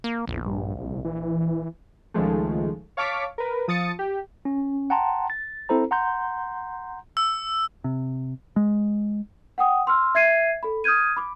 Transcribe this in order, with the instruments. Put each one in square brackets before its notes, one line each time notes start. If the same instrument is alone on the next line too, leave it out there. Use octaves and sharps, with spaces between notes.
[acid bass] A#3
[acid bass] A#1 [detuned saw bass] E2
[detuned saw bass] G2
C2
E3
[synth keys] C#2 D#3 F3 G#3 A3
C#5 F5 A5 C#6 D6 B6
A#4 B4
F3 D#6 A6 C#7
G4
[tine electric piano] C#4
F#5 G5 A5 A#5 C6
A6
C4 E4 A4 C5 A#5
F#5 A#5 C6 G6
[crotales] E6
[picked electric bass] C3
G#3
[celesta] F#5 G5 D#6
C6 E6 F6
E5 G#6 C7 D#7
A4 B5
D#6 F6 G6 G#6 D#7
B5 D6